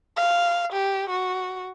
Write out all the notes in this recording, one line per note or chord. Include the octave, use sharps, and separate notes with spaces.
F5
G4
F#4